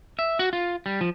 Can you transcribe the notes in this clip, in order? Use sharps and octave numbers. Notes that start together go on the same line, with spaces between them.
E5
F#4
F4
G3
F3